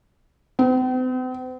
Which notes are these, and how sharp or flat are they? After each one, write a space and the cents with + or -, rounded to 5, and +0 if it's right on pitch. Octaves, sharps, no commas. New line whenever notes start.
C4 -45